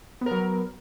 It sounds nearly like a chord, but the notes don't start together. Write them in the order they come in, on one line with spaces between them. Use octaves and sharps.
B3 A#4 F#3